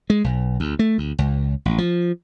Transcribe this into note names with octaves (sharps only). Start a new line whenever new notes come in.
G#3
B1
D2
A3
D2
C#2
A1
F3